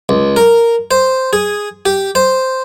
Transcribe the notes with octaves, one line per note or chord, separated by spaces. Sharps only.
C#2
A#4
C5
G#4
G4
C5